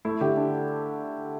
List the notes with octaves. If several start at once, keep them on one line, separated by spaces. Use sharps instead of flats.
A3 E4
D3 G4
D4